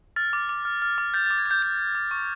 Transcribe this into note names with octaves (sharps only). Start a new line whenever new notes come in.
F6 A6
D6
D6
F6
F6
D6
G6 A6
A6
D6
G#6
D6 G6
G6
G6
D6
C#6